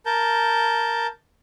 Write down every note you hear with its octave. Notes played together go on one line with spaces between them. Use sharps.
A#4 A5 G6